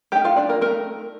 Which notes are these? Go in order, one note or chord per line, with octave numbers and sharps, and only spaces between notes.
A3 D#4 G4 G5
F4 F5
D4 D5
A#3 A#4
A3 A#3 D#4 A#4